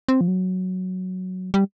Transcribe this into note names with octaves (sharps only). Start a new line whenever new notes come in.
C4
F3
F#3
G3